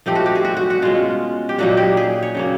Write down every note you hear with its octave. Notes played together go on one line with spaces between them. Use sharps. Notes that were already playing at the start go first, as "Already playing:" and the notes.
F3 A3 C4 D#4 G4
F#4
G4
G#4
F#4
F#4
F#4
B2 G#3 C#4 F4
G4
A#2 F#3 A#3 D#4 F#4
G4
G#4
C#5
C#3 F#3 A#3